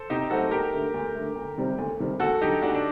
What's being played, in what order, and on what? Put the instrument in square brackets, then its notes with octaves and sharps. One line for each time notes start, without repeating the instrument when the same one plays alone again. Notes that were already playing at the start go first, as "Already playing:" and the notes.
Already playing: [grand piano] A4 C5
[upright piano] C3 [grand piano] D#4 G4
[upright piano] F#3 A3 C4 [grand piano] F#4 A4
[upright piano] D2 [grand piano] G4 A#4
[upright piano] D3 A3
D2
D3 A3
D2
C3 D#3 G3 C4
D2
C3 D#3 G3 C4
[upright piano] D2 [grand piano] F#4 A4
[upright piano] D3 F#3 [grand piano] D#4 G4
[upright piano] D2 [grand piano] D4 F#4
[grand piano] D4